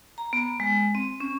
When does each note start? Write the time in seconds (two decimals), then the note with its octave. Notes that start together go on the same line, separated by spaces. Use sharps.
0.18 A#5
0.33 B3
0.60 G#3
0.95 C4
1.20 C#4